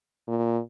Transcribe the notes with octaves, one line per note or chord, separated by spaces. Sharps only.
A#2